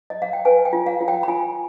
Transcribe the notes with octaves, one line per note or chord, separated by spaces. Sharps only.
D#5
F5
G5
B4 G#5
G5
F4
F5
F4
G5
B5
F4 G#5